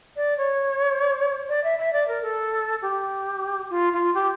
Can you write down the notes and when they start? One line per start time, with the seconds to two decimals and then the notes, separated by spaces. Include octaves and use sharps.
0.16 D5
0.38 C#5
1.49 D5
1.64 E5
1.79 E5
1.93 D5
2.08 A#4
2.22 A4
2.82 G4
3.70 F4
3.93 F4
4.14 G4